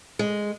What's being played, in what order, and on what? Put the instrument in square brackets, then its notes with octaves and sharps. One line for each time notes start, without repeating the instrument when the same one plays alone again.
[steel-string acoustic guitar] G#3